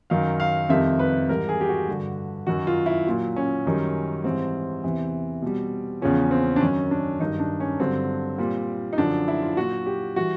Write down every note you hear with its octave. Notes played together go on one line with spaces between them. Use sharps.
F#2 D#3 F#3 F5
F5
F2 C3 D#3 G3 E5
B4
G#2 E3 G3 A#4
G#4
G4
F#4
G2 D3 G3
F#2 D#3 F#3 F#4
F4
E4
A#2 F#3
C#4
F#2 D#3 G3
G#2 E3 G3 C4
E2 C3 E3
B2 G3
E2 C#3 F3 C#4
C4
D4
F#2 D#3 F#3 C#4
D4
G2 D#3 F#3 D#4
D4
C#4
G2 D3 F#3 C4
A#2 G3
D#4
F#2 D3 F3 D4
E4
F4
A#2 F#3 F#4
G4
E3 G3 F#4